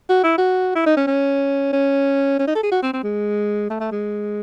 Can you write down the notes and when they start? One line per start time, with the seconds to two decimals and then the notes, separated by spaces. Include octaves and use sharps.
0.09 F#4
0.24 E4
0.38 F#4
0.75 E4
0.86 D#4
0.97 C#4
1.07 C#4
1.73 C#4
2.39 C#4
2.47 D#4
2.55 A4
2.63 G#4
2.71 F#4
2.83 C4
2.93 C4
3.03 G#3
3.70 A3
3.80 A3
3.91 G#3